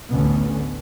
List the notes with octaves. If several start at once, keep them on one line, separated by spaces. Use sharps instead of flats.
A1 D2 D3 B3 C#4